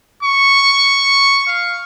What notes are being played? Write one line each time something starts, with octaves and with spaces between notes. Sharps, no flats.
C#6
F5